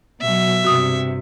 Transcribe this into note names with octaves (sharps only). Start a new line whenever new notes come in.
B2 F#3 E5
G2 C3 F#4 D#6